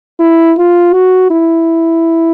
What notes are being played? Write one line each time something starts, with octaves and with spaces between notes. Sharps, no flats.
E4
F4
F#4
E4